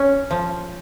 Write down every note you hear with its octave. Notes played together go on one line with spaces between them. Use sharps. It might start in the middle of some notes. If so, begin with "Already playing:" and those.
Already playing: C#4
F3